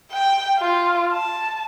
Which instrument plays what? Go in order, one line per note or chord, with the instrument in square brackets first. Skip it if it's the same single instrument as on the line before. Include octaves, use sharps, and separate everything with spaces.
[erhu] G5
F4
A5